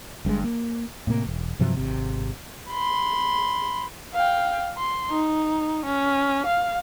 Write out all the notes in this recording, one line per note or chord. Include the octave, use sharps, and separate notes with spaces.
G1 G2 B2 G#3
A#3
A2 C3 A#3
E1
G2 C3 F3 F#3
G#1 C3
B5 C6
F5 G5
C6
D#4
C#4
F5